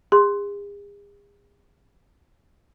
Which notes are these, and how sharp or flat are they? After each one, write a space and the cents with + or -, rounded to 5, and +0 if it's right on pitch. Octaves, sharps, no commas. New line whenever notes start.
G#4 -40 C6 +0